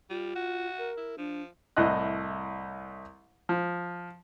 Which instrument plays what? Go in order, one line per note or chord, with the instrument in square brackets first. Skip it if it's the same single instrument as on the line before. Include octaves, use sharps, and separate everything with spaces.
[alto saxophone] G3 [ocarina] F4
[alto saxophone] F#4
[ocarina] A#4
[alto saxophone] E4
[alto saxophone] F3 [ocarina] D4
[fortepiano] C2 A2 D#5 F#6
F3